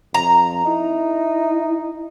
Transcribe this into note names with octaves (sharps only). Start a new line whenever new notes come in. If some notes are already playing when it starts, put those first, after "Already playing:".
F2 A#5
D#4 E4